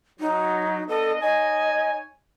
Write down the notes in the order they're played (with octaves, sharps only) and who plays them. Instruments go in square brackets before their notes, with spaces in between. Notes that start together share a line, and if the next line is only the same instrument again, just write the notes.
[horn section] F#3 [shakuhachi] D#4
[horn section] B3 D4 D#5 [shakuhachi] A4
[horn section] D#4 C#5 G#5 [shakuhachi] D#5